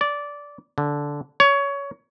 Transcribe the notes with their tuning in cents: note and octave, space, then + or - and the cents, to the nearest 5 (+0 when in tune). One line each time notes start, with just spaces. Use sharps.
D5 -15
D3 -10
C#5 +20